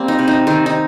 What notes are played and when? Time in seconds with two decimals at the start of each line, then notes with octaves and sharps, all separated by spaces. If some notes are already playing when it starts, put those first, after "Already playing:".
Already playing: G3 A#3 C4
0.08 D#4
0.19 C3
0.28 D#4
0.47 D#3 C4
0.66 D#4